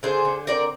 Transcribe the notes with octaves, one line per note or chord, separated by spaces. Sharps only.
D3 G#4 C5
D3
C4 A#4 D5